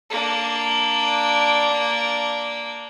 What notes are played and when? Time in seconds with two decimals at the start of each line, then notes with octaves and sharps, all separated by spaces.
0.10 A#3 D4